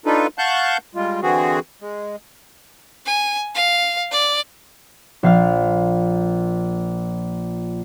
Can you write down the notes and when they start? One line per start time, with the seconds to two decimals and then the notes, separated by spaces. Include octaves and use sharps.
0.06 D4 D#4 F4 A4 B4
0.38 F5 F#5 A5 C#6 F#6 G6
0.95 G3 G#3 F4
1.22 D3 E3 C4 F#4 G#4
1.81 G#3
3.06 G#5
3.55 F5
4.11 D5
5.23 A#1 F5 F6